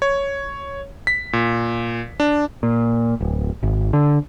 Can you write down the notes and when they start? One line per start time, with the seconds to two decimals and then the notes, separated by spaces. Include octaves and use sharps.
0.02 C#5
1.07 B6
1.33 A#2
2.20 D4
2.63 A#2
3.20 D1
3.63 G#1
3.93 D3